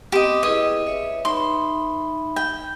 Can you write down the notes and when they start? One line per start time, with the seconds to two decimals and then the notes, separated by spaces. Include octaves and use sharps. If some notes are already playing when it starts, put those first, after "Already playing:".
0.12 B3 C4 G4 D#5
0.43 E4 G#4 B4 D#5
0.87 B4 C#5 E5
1.25 D#4 E5 B5 C6
2.36 G5